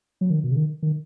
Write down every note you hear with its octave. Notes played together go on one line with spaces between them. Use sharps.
F#3
D#3
B2
C#3
D#3
D#3